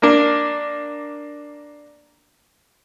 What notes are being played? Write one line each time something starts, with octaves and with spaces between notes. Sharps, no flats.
A#3 D4